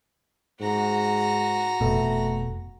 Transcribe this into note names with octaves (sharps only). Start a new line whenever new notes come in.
G#2 F#4 A#5
F1 B2 A3